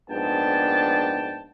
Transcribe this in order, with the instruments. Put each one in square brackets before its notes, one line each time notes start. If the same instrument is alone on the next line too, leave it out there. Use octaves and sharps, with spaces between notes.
[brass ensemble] A#1 G#2 B3 D4 G5 A5